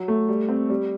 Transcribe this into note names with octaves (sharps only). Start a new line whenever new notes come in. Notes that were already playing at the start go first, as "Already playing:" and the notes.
Already playing: F#3
A3
G3
C4
G3